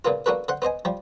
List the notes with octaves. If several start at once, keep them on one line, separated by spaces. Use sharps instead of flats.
A#2 C#3 A#3 B3 F4
A#3 B3 D4 F#4 A4 B4
D3 C5 F#5
B3 C5 D#5 G#5
F3 G3 G4